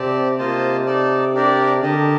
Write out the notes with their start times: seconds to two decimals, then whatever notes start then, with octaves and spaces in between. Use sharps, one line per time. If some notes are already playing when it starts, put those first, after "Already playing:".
Already playing: C3 C4 G4 D5 A5
0.38 C3 A#3 F4 C5 D#5 A5
0.86 D#4 A4 D5 A5
1.34 D4 G4 A#4 D5
1.82 D3 G4 A#4 D#5 A5